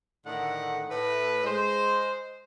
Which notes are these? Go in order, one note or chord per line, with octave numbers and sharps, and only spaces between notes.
A2 D3 D#3 F#5
A2 B4
G#3 C5